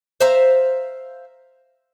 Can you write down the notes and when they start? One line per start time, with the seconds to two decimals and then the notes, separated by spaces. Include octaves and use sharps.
0.21 C5 E5 F5 A#5